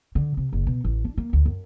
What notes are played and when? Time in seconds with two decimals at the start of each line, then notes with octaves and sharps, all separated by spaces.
0.15 D3
0.37 C3
0.53 F#1
0.67 B2
0.84 A1
1.05 D4
1.18 A#3
1.33 D2
1.45 F#2